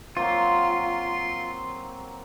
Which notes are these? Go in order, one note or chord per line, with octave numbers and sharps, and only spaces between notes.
F#3 A#3 C4 F4 C6